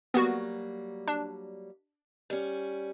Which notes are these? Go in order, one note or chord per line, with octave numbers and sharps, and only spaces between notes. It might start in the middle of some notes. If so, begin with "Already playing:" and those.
F#3 G3 A#3 B3 F#4
D4
G3 C#4